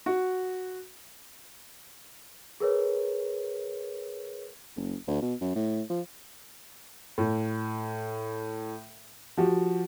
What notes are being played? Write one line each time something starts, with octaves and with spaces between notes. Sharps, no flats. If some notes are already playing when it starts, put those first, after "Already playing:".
F#4
G#4 A#4 B4 C#5
F#1
D2
B2
F#2
A2
F3
A2
F3 F#4 G4